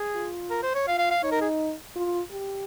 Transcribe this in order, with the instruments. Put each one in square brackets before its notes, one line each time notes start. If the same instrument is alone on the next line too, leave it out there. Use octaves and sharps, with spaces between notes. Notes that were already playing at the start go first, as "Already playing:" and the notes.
Already playing: [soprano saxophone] G#4
[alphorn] F4
[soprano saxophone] A#4
C5
C#5
[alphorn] F4 [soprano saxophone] F5
[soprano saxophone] F5
F5
[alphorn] D#4 [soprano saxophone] C#5
[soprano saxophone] A#4
G#4
[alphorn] F4
G4